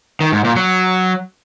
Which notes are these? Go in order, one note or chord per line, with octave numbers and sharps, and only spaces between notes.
D#3
G#2
A#2
F#3